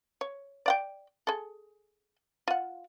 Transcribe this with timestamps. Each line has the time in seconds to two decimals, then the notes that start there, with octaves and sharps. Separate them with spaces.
0.21 C#5
0.66 D5 F#5 G5
1.27 G#4 A4
2.48 F4 F#5